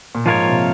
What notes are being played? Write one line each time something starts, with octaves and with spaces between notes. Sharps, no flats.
A#2
G#2 F3 A#3 F4 A#4 C#5
C3